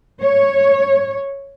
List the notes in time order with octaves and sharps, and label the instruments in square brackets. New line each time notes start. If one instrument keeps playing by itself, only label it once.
[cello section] C#5